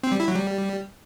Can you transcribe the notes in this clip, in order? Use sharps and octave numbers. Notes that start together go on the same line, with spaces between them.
C4
G3
E4
F#3
G3